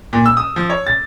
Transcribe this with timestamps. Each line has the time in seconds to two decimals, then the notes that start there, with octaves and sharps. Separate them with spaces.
0.13 A#2
0.26 E6
0.37 D#6
0.56 F3
0.70 C#5
0.87 A6